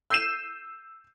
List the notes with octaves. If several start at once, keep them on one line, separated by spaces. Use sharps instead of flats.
E6 G6 C7 D#7 E7